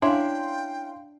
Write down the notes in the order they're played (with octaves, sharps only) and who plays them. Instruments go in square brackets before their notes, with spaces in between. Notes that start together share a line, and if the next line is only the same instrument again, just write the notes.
[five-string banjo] C#4 E4 [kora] D4 [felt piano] F5 C6 [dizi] G5